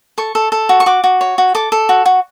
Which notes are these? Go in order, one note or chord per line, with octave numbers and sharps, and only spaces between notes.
A4 C#6
A4
A4
F#4
C#6
F#4 D6
F#4
C#5
F#4
A4 D6
A4
F#4
F#4